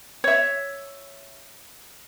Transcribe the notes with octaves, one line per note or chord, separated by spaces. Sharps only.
C#5 E5